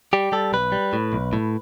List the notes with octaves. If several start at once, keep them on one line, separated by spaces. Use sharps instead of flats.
G3 G4
G3 A4
B1 B4
G3
A2
B1
A2